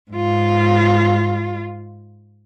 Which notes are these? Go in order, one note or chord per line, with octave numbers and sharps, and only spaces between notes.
G#2 F4